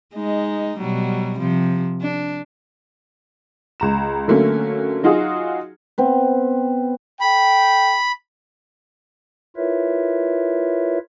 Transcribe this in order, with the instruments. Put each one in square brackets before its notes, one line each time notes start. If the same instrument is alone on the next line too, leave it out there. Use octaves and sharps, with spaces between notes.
[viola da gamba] G#3 D#4
B2 F#3 G3
C3 F3
D4
[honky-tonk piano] C#2 A#5 E7
D3 F#3 A3 A#3 C#4
F#3 D#4 F4 F#4 G#4
[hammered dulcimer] B3 C4 B4
[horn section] A4 G5 [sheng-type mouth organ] B5
[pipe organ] E4 F4 A#4 B4 C#5 E5